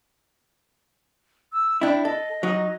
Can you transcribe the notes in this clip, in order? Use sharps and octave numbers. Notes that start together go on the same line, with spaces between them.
E6
D4 E4 G5
A4 D#5
F#3 D#4